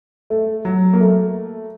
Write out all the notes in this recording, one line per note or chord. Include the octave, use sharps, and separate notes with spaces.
A3
F#3
A#3
A3